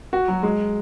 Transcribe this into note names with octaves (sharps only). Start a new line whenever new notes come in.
F#4
F#3
G#3